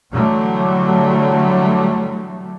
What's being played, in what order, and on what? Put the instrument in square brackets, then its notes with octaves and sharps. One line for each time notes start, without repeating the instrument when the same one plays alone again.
[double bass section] D3 E3 F#3 G3 A3